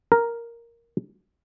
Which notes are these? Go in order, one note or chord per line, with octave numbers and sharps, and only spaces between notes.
A#4